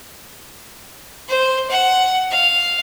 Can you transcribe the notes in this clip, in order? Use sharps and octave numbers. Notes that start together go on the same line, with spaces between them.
C5
F#5
F5